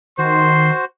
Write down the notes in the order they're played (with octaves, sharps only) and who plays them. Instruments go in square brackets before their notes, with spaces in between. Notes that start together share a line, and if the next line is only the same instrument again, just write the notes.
[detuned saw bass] D#3 [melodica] F#4 C5 [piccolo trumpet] C6